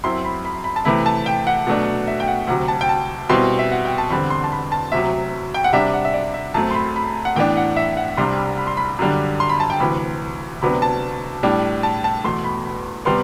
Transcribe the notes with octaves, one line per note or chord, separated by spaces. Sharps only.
F#2 F#3 C4 E4 C6
B5
B5
B5
A5
C3 E3 A3 E4 B5
A5
G5
F#5
B2 F#3 A3 D4
E5
G5
F#5
D2 C3 F#3 F#5
A5
G5
A5
B2 G3 C4 E4 C6
E5
F#5
G5
A5
E2 D3 G3 C4 B5
C6
A5
B5
A5
D2 C3 F#3 E5
G5
F#5
C3 G3 D4 E5
F#5
E5
D5
E5
F#2 F#3 A3 C4 A5
C6
B5
B5
F#5
A2 E3 B3 D4 G5
F#5
E5
F#5
C2 C3 G3 D4 C6
B5
B5
C6
B5
F#2 D3 G3 D4
C6
B5
A5
G5
D2 C3 E3 B5
D2 C3 F#3 B3 D4 B5
A5
A2 G3 D4
A5
A5
E2 B2 A3 C6
B5
B5
C3 G3 B3 C6